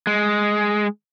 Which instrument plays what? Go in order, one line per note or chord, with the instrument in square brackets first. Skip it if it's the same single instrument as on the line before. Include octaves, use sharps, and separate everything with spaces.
[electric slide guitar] G#3